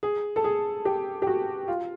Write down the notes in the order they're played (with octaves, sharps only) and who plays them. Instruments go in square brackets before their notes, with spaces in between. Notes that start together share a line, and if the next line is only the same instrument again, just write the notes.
[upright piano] G#4
A4
G#4
G4
G4
F#4
F4